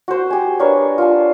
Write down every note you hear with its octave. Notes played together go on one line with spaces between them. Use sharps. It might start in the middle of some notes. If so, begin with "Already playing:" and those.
F#4 C5
G4 G#5
D4 A#4 B4 C#5
F4 A5